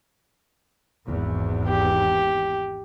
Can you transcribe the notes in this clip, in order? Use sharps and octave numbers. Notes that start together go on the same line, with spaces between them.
G#1 E2 G#2
G4